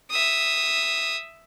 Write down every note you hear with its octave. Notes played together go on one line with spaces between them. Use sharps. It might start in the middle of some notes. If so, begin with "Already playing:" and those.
E5 D#6